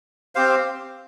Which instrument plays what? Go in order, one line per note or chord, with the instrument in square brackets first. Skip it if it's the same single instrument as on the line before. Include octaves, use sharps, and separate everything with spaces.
[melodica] C4 G4 C5 F5